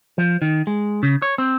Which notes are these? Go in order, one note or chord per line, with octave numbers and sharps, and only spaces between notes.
F3
D#3
G#3
C#3
C#5
C4